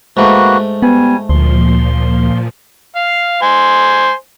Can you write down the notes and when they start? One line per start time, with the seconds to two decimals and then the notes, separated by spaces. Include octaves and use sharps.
0.17 G#2 A3 A#3 F#4 B4
0.82 G3 B3 G#5
1.29 D2 A#2 F3 C6
2.96 F5
3.42 C5 G#5